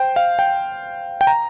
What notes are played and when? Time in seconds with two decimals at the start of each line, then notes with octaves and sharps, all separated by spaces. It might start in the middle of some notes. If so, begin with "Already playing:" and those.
Already playing: C5 G5
0.16 F5
0.39 G5
1.21 G5
1.27 A#5